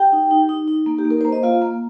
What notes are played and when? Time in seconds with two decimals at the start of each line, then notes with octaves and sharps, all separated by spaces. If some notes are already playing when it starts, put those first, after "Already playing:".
Already playing: G4 G5
0.12 D#4
0.31 D#4
0.49 D#4
0.68 D#4
0.86 A#3
0.98 G4
1.05 A#3
1.11 A#4
1.21 A#3 C5
1.32 D#5
1.43 A#3 F4 F5
1.62 A#3